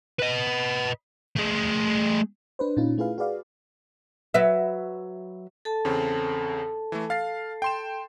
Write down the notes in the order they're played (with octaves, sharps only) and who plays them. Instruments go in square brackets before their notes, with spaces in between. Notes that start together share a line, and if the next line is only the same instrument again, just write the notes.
[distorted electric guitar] B4 D#5
A3 G#4
[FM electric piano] D4 B4 C5
A#2 C#4 D#4 F4
A3 E4 F4 G#4 B4 F5
F#4 G#4 B4 D5 F5
[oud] F#3 B4 E5
[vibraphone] A4 A5
[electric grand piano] E2 C#3 C4
E3 A3
F5 A6 C7
G5 C6 E7